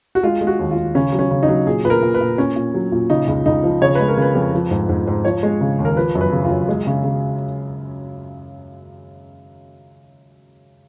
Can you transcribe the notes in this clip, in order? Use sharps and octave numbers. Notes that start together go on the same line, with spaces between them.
F#4
G#3 F4
G#3
F#4
D#2
F4
D#2
C#3 C#4
F#3
C#4
C#3
D#4
F#3
A#2 G#4
A#2 B4
A#4
A#2
B4
A#2
A#2 C#4
A#2
F#3
A#2
C#3 D#4
C#2
C#2 D#4
F3
C#3 C#5
G#3 B4
A#4
C#3 B4
F2
F3
G#2
G#2
G#2
F3 C#5
G#3
C#3
D#2
A#4
F3 B4
F#2
B4
C#3
F4
F#2
G#3
C#3
C#3